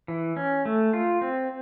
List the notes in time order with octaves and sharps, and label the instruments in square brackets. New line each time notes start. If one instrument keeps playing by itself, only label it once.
[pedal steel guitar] E3
C#4
A3
F4
C4